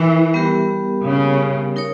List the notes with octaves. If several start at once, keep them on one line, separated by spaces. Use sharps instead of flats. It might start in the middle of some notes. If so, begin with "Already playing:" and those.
Already playing: E3 E4 A#4 E5
G3 B3 G4 A#4
C#3
D#4 A#4 C#5